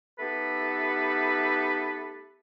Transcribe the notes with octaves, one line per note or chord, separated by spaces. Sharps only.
A3 B3 D#4 G4 A4 B4